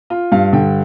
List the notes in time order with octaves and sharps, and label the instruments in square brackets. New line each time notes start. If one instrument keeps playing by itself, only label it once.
[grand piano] F4
G2 F5
D3 G5